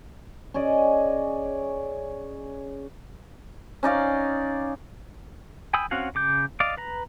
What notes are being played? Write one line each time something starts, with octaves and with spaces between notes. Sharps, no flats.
C#4 G#4 D5 D#5
C#4 D#4 D5 F5
G5 G#5 B5 D#6 E6
C4 C#4 F#4 F5 F#5
C#3 D6 G6
D5 D#5 F5 D6
B4 A#5